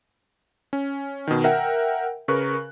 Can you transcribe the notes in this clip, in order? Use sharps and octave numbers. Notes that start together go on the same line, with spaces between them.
C#4
B2 D#3
A#4 E5 F#5 G5
C#3 A#4 B4 C#6 F#6